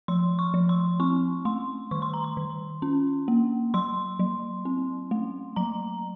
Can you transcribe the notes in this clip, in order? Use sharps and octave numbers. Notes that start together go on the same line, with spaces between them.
F3 C6
C#6
F3
C6
C4 C#6
A3 C6
D#3 C#6
C6
A#5
C6
D#3
C#4
A#3
F#3 C6
F#3
C4
A3
F#3 A#5